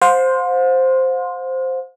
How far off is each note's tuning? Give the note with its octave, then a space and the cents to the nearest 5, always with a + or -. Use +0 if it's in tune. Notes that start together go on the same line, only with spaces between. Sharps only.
C5 +0 F5 +45